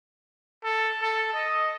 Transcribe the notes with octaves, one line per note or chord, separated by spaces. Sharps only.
A4
A4
D#5